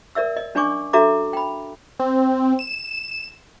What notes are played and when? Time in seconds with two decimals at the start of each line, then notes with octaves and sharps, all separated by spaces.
0.15 A#4 D5 E5 E6
0.37 D#5
0.55 C#4 D4 D5 G#5 C#6 D6
0.93 D4 F#4 A4 E5 A#5 D6
1.33 G5 B5
2.00 C4
2.59 E7